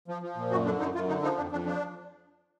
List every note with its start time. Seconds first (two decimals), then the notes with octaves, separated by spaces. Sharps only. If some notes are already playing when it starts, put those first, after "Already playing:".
0.08 F3
0.22 F3
0.36 A#2
0.51 F#2 F#4
0.65 D3 D4
0.80 F#2 D#4
0.94 F#2 F4
1.08 D3 D#4
1.23 F3 D#4
1.37 F2 D4
1.51 F2 D4
1.66 F3 D4